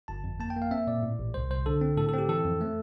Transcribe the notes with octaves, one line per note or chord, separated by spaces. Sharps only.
G1 A5
F2
A#3 A5
G5
A#3
F5
C4 E5
A#2 D5
A2
A1
C2 C5
C2 C5
D3 A4
C4
A2 A4
A4
C4 G4
E3 A4
F2
A3